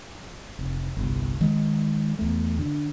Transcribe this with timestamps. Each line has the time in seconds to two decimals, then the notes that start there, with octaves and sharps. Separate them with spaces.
0.59 F1
0.97 G1 C2
1.41 D#3 F#3 G#3
2.19 E2 A3
2.59 D3